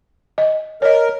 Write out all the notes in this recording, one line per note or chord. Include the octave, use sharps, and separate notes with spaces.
D#5
A#4 C#5 D#5